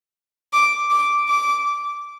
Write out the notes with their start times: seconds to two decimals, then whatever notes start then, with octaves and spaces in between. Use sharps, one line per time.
0.53 D6
0.91 D6
1.28 D6